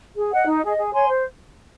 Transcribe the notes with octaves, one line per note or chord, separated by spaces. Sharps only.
G#4
D#5 F#5
D#4
G#4 D#5
G#4
C#5 G#5 C6
C5